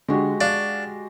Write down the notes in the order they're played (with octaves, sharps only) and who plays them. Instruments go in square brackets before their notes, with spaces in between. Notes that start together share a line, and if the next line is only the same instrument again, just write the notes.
[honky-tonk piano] D3 [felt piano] G#3 F#4 G4
[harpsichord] D4 [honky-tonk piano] F5